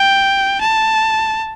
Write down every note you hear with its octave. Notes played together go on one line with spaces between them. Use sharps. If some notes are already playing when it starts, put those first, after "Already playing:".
Already playing: G5
A5